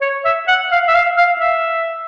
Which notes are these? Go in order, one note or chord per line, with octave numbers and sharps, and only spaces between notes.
C#5
E5
F#5
F5
E5
F5
F5
E5